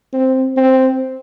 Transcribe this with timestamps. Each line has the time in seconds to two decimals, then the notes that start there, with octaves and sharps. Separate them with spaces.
0.13 C4
0.57 C4